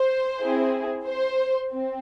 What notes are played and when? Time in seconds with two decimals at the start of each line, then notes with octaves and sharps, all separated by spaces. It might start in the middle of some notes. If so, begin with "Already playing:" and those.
Already playing: C5
0.39 C4 E4 G#4
1.06 C5
1.71 C4